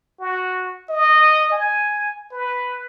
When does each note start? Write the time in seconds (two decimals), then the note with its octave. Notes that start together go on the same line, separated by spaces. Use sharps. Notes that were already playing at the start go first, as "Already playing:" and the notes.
0.20 F#4
0.89 D#5
1.52 G#5
2.32 B4